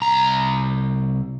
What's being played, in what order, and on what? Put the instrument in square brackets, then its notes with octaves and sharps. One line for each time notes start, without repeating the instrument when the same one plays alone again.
[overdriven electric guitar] C2 A#5